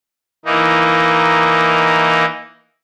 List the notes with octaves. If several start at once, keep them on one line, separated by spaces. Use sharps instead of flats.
E3 A#3 D#4